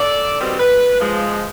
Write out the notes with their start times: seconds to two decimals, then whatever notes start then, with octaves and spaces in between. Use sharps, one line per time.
0.01 A4 D5
0.40 B2 D#3 G3 C4
0.59 B4
1.01 F3 G#3